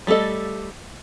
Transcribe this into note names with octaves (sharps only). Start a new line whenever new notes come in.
G3 A3 G#4 A4 D#5